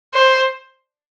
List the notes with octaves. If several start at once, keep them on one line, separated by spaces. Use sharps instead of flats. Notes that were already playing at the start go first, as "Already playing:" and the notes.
C5